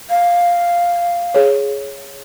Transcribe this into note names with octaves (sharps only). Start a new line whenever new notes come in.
F5
G#4 C#5